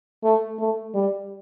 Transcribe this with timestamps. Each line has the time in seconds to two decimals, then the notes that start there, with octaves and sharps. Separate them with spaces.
0.23 A3
0.59 A3
0.95 G3